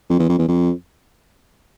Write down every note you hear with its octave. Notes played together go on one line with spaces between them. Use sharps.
F2
E2
F2
E2
F2